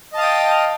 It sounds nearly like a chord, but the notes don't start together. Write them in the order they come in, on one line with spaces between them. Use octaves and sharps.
D#5 A5 F5 D#6 G5